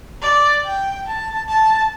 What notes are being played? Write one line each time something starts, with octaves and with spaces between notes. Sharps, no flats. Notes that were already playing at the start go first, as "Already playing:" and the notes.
D5
G5
A5
A5